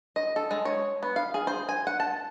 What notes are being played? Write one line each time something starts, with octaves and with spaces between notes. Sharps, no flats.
D#5
A4
G#3
C#5
B3
F5
G#4
C5
G#5
F#5
A5